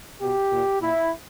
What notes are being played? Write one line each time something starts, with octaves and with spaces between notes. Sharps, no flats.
B2 G4
A#2
A#2 E4